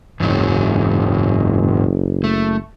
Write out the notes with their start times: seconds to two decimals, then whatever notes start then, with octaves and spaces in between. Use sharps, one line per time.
0.20 F#1 E2 G#2 F#3
2.24 A3